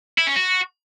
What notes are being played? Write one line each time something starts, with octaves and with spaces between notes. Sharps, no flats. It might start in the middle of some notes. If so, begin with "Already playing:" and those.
E4
C#4
F#4